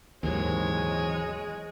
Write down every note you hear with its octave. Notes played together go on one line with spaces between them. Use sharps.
D#2 G#2 E3 F#3 G#3 C4 C#5